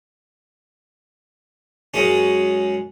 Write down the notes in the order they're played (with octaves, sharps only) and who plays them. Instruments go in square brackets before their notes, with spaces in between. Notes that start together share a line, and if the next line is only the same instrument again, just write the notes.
[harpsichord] F#2 G#3 C#4